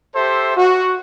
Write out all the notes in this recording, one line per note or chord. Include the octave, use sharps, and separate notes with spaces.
G4 A4 C5 E5 C6
F#4